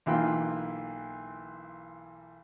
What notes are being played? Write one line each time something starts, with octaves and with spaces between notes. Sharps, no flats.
B1 E3 A#3 F4 G5